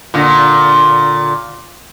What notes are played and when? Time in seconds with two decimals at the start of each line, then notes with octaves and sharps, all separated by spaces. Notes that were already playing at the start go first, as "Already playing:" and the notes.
0.14 A#2 D3